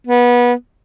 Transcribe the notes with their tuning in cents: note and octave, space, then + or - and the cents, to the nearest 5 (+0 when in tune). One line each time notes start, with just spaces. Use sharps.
B3 -25